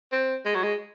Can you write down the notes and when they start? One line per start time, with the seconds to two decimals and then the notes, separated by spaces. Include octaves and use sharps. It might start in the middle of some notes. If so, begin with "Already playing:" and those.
0.12 C4
0.45 G#3
0.55 F#3
0.63 G#3